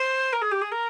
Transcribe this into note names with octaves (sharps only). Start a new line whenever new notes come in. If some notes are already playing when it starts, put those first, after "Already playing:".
Already playing: C5
A#4
G#4
G4
G#4
A#4